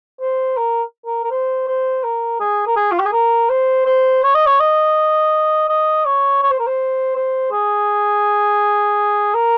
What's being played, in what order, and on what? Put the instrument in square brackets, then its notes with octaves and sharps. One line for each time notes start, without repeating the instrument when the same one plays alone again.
[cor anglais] C5
A#4
A#4
A#4
C5
C5
A#4
G#4
A#4
G#4
F4
G4
G#4
A#4
C5
C5
C#5
D#5
C#5
D#5
D#5
C#5
C#5
C5
A#4
C5
C5
G#4
A#4